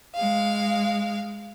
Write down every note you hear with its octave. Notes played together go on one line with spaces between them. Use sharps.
G#3 F5